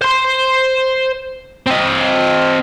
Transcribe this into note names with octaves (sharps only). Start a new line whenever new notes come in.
C5 C6
C4 D#5